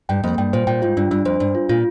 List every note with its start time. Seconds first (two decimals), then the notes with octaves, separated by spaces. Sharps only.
0.09 G2 G5
0.24 F2 A#3
0.38 G2 G5
0.53 A#2 C5
0.67 A#2 G5
0.82 G#2 F4
0.97 G2 D4
1.11 G2 D4
1.25 F2 C5
1.40 G2 D4
1.55 F4
1.69 A#2 F4